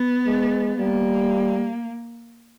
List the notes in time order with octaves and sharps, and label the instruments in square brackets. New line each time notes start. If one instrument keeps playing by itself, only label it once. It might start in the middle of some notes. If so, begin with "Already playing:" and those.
Already playing: [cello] B3
[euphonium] G#3
[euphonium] G3 [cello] A#3